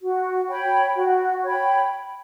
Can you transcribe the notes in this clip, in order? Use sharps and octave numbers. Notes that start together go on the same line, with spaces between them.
F#4
C#5 G5 B5
F#4
C#5 G5 B5